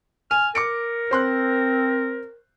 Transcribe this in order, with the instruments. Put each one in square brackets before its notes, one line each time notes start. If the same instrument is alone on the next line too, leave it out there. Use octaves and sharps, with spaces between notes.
[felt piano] G#5 [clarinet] F6
[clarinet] A#4 [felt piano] D6 C#7 D7
[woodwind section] C4 [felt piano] C5 C6 F#6